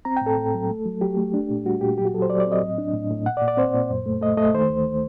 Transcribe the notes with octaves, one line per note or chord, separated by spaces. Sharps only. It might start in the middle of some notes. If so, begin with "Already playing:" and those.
C4 A#5
A2 G5
A4
A2
F#3
A3
F#3
F#3 G4
A3
D4
A#2
G3 F#4
A#2 G4
F#3 G4
F#4
F#3 A4
C5
F#3 D5
D5
C4
D#5
A2
D4
A2
A2
A#2 F#5
D5
A#2
D5
C4 C5
A#2
F#2
A3
A3 D#5
A3 D#5
D#3 C5
D2